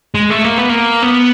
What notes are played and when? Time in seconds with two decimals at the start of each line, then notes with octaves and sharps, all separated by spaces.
0.14 G#3
0.30 A3
0.44 A#3
0.58 B3
0.69 A#3
1.03 B3